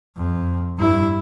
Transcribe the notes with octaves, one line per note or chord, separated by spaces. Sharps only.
F2
G2 E4